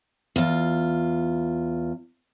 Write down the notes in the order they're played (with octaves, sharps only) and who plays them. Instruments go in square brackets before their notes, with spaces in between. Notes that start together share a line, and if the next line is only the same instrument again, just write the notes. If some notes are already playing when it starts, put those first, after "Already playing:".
[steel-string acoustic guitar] E2 F4